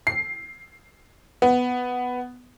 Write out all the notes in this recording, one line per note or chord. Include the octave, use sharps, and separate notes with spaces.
C7
B3